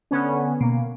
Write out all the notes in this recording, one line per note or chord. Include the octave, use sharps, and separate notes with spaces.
D3 B3 C#4
B2 A#3